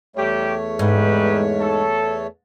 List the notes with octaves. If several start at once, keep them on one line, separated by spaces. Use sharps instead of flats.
E2 G3 A3 G4 C#5
G#2 G3 D#4 B4
A4